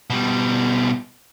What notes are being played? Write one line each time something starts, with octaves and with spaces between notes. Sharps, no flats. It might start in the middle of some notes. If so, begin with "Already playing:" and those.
B2 G3